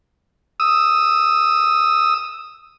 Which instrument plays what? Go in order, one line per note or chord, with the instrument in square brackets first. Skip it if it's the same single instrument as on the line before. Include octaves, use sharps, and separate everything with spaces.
[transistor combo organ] D#6 E6